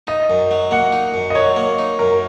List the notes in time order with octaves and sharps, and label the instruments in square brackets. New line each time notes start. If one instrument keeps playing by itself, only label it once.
[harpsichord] D#4 [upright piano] D#5
[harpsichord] F#2
F#3
[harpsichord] A#3 [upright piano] F#5
[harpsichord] D#4
F#2
[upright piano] D#5
[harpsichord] F#3 [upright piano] C#5
[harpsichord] A#3
D#4
[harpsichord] F#2 [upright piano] A#4